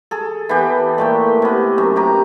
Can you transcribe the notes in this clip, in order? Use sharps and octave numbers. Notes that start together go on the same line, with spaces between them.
G#4 A4
E3 B3 G4
A#2 A3 G5
C3 B3
F#2
C3 G4 A#5